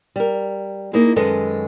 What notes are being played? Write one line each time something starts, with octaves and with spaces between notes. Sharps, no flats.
G3 A#4
A#3 D#4 E4 G#4
F#2 D#3 G#3 A4 B4 D#5